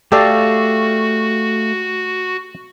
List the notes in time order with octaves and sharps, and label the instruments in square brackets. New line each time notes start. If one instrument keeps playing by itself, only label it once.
[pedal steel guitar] A3 F5 [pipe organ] F#4 [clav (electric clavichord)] G4 A4 D5